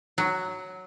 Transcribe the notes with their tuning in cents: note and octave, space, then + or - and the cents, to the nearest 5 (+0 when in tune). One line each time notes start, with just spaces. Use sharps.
F#3 +0